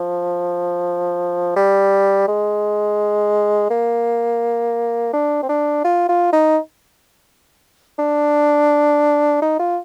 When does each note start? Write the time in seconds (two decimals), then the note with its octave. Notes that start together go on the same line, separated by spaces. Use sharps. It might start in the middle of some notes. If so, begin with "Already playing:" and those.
Already playing: F3
1.56 G3
2.28 G#3
3.70 A#3
5.13 D4
5.43 C4
5.49 D4
5.85 F4
6.09 F4
6.33 D#4
7.99 D4
9.42 D#4
9.59 F4